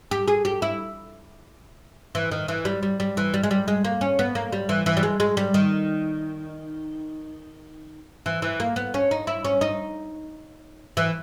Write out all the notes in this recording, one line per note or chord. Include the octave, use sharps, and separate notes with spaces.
G4
G#4
G4
E4
E3
D#3
E3
G3
G3
G3
E3
G3
G#3
G3
G#3
A#3
C#4
B3
A#3
G3
E3
E3
G3
G#3
G#3
G3
D#3
E3
E3
A#3
B3
C#4
D#4
E4
C#4
D#4
E3